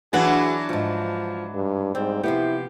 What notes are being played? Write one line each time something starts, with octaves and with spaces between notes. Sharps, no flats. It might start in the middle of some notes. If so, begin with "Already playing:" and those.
E3 F#3 D4 F#4 G#4 B4 F#5
D2 G#2 F3
G2
G#2 G3 C4
C3 F3 B3 E4 G4